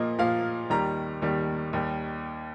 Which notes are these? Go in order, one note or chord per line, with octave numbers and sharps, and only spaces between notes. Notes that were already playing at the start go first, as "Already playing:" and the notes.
Already playing: A#2 F3 A#3 D#5
A#2 F3 A#3 F5
D#2 D#3 G3 A#5
D#2 D#3 G3
D#2 D#3 G3